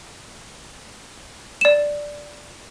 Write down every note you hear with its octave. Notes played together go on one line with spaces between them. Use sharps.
D5 E7